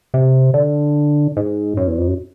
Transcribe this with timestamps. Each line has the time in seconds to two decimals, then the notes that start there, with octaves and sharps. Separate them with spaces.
0.14 C3
0.54 D3
1.37 G#2
1.77 F#2
1.87 E2
1.98 F2
2.08 F#2